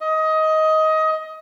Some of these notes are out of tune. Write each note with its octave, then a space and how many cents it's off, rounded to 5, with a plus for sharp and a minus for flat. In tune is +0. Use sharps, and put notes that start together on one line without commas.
D#5 +20